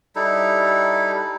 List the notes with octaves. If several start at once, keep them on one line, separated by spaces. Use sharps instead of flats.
G3 D#4 E4 A4